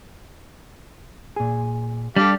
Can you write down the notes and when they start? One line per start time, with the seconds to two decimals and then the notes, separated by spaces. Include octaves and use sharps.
1.36 A#2 G#4
2.16 G3 D4 G4 A4 F5